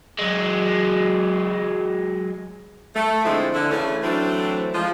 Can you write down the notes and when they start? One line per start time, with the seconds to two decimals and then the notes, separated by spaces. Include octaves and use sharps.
0.19 F#3 G#3
2.95 A3
3.24 D3 F3 G#3 C4 D#4 E4
3.54 D3 E4
3.70 C#3 E3 A3 C#4
4.04 E3 F#3 A3 C4 D4 E4
4.74 F3 G#3